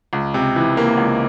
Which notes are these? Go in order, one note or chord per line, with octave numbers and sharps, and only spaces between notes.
C#2
C3
E3
A#3
C#2